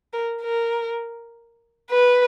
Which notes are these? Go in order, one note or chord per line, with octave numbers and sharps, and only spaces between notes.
A#4
A#4
B4